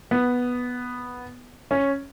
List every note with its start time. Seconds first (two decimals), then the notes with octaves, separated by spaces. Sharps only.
0.11 B3
1.71 C#4